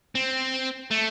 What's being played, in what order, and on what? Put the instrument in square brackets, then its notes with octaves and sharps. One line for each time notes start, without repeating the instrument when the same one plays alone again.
[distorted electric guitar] C4
A3